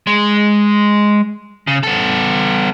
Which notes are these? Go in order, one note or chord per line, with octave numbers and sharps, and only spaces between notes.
G#3
C#3
B3 A4